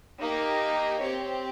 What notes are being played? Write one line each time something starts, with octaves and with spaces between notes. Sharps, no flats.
A#3 D#4 G4
C4 G4 C#5